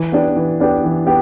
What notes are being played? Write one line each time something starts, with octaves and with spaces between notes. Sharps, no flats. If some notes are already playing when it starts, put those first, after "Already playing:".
Already playing: E3
B3 D4 G4
E3
B3 D4 G4
E3
B3 G4